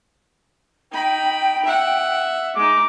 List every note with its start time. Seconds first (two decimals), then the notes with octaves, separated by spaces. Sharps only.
0.92 D#4 G5 B5
1.65 E5 F#5
2.56 G#3 D#4 D6